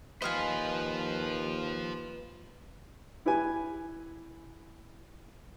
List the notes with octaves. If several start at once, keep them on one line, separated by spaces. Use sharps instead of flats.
D#2 F4 B4 C5 D#5 F5 G#5
E4 G4 B4 G#5